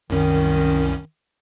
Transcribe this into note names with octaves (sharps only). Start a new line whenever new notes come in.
C2 F#2 D#3 C#4